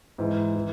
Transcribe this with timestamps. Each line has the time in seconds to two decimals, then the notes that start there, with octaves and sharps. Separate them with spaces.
0.18 G#2 E3
0.56 E3